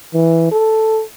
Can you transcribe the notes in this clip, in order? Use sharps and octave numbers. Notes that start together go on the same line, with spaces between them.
E3
A4